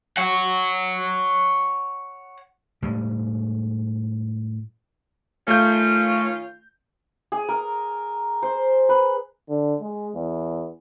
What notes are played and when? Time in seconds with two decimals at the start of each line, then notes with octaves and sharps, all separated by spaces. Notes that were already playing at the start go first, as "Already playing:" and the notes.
0.17 C#5 F#5
2.82 A2 G3 G#3
5.48 D#3 A3 C#4 F4 G6
7.32 G#4
7.49 A#4
8.42 C5
8.89 B4
9.49 D3
9.81 G#3
10.15 E2